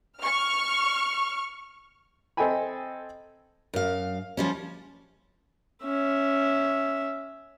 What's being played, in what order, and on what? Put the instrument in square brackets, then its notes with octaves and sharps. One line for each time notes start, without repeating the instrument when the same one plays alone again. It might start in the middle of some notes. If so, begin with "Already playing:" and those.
[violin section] C#6 F6
[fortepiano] C4 A4 D#5 G5 G#5 B5
[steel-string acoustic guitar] F#2 F5
F3 G3 C#4
[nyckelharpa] C#4 E5